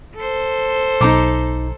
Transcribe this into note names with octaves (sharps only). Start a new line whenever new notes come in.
A4 C5
B1 D#4 A#5 D6